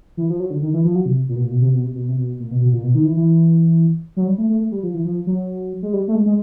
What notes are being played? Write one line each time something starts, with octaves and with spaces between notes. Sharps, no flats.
E3
F3
F#3
D3
D#3
E3
F3
F#3
C3
A#2
B2
A#2
B2
C3
B2
C3
B2
C3
B2
A#2
B2
B2
A#2
B2
D#3
E3
E3
F#3
G3
A3
A3
A3
G3
F3
E3
F3
F#3
G#3
G3
A3
G#3
G#3